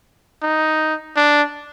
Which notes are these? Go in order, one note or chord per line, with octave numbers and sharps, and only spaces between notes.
D#4
D4